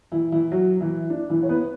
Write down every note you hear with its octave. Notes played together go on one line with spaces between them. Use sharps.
E3 E4
E3 E4
F#3 F#4
E3 E4
D4
E3 E4
C#5
B3 B4